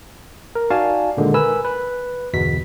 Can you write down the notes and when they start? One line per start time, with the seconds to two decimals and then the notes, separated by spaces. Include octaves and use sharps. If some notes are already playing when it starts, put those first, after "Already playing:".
0.55 A#4
0.70 D#4 F#4 D5 F5 G#5 A5
1.17 A#2 D3 D#3 G#3
1.34 A#4 B4 G#5 B5 E6
1.65 B4
2.33 G1 E2 B2 B6